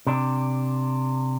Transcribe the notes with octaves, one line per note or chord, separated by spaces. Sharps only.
C3 D4